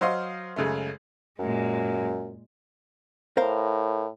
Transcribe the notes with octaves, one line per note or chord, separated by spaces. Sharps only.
F#3 C5 D#5 F5 C6
F#2 C#3 G#3 A3
F#2 A#2 G#3
A2 A#4 C5 F5